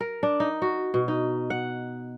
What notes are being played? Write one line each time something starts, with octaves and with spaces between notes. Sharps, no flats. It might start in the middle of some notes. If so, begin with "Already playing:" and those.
A#4
D4
D#4
F#4
B2
D#4
F#5